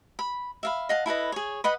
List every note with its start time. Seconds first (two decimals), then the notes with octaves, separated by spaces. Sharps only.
0.19 B5
0.63 E5 F5 B5
0.89 D#5 F5 F#5 A5
1.06 E4 A4 B4 D#5
1.32 G#4 C#5
1.64 B4 D#5 F#5 B5